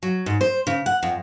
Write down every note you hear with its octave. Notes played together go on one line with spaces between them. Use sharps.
F#3
G#2
C5
C#3
F#5
F2